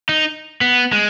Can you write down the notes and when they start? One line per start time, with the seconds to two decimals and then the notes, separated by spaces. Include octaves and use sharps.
0.09 D#4
0.61 B3
0.92 G#3